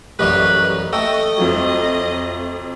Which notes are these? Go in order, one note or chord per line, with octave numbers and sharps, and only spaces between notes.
A1 F#2 G3 B4 D#5
A3 D#5 G5 C#6 E6
F2 F3 F#3